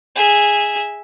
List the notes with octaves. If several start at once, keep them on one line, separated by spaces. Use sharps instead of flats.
G#4 E5